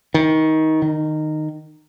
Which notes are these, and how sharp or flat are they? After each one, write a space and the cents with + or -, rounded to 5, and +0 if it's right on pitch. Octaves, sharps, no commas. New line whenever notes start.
D#3 +20
D#3 -15